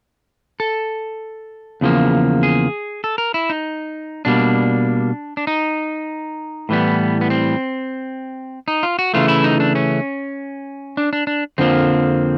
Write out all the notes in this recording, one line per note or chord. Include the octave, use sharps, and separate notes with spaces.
A4
E2 C#3 F3 A#3
G#4
A4
A#4
E4
D#4
B2 G3 A#3 D4
D4
D#4
A2 E3 G3 B3
B3
C4
D#4
F4
F#4
C#3 E3 A3 F4
E4
D#4
D4
C#4
D4
D4
D4
F2 D3 F3 A#3 C4